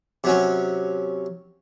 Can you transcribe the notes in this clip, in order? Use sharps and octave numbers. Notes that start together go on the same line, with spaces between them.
C3 F#3 C#4